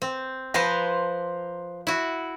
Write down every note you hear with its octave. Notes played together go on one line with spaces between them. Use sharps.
C4
F3 B4 C5 A5 A#5
E4 F#4